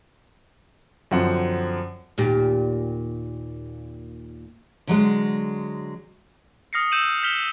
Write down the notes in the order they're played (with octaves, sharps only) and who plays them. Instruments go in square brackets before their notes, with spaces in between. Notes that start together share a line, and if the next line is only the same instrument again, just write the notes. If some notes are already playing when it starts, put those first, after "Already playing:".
[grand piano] F#2 D3 F3 C4 F#5
[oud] D#2 A#2 G4
[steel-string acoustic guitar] D3 F#3 G#3
[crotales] D#6 F6 A#6 C7 C#7
E6 G6 C#7 D#7 E7 F#7
F6 G6 B6 F7 G7